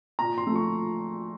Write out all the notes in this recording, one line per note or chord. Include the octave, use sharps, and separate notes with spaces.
A#2 A#5
C6
F3 A3
C#6